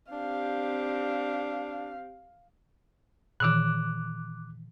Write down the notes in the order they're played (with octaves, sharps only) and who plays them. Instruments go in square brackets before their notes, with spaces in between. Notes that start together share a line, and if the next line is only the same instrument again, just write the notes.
[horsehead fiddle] C4 G4 [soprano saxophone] D4 [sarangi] F5
[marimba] A#2 D#3 E3 [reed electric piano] D6 F#6